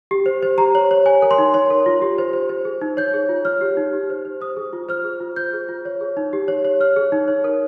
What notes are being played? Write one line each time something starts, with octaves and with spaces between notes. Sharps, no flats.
G4
C5
C5
G4 A#5
C#5
C#5
C#5 G#5
A#4
C6
D#4
C#5 C6
A#4
F4
G4
C5
C5
C5
G#4
D#4
C#5 G6
G#4
F4
C#5 F6
G4
D#4
G4
C5
C5
C5 D#6
G#4
F4
C5 F6
G#4
F4
C5 G6
G#4
F4
C#5
G#4
D#4
G4
C#5
C#5
C#5 F6
G#4
D#4
C#5
A#4